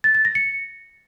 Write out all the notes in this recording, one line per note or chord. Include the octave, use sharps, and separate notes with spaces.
A6
A6
A#6
C#7